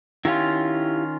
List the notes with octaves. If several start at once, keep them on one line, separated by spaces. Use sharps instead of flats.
D#3 C#4 E4 F4 G4 F5